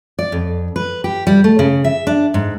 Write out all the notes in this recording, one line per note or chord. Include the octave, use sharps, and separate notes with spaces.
D5
F2
B4
G4
G3
A3
C#3
E5
D4
G#2